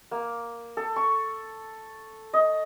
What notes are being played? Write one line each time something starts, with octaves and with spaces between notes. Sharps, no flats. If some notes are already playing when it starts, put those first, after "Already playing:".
A#3
A4
C#6
D#5